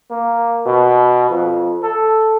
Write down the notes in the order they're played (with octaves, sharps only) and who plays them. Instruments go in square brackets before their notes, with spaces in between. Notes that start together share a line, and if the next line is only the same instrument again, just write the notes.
[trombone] A#3
B2
F2
A4